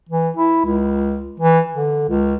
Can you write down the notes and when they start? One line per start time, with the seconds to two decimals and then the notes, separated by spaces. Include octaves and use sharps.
0.09 E3
0.37 E4
0.65 C#2
1.40 E3
1.73 D3
2.09 C#2